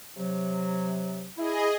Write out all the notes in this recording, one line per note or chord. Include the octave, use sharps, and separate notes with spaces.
C3 F#3
E4 G#4 D#5